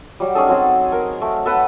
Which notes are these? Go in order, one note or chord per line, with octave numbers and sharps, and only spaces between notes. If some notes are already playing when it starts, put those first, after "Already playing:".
F#3 G3
C#4 D#4 G#4 A4
F#3 C4 F#4
A#4
A3
A4 B4 F#5 G5